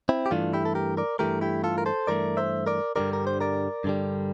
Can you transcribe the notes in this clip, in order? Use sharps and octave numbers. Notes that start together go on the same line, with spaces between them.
C4 E4
G4
G2 E3 A3 D4 F4
E4 G4
A4
G4 A#4
A#4 D5
G2 E3 A3 G4 A#4
E4 G4
F4 A4
A#4
A4 C5
G2 E3 A3 A#4 D5
C5 E5
A#4 D5
G2 D3 G3 A#4 D5
A#4
C5
A#4 D5
G2 D3 G3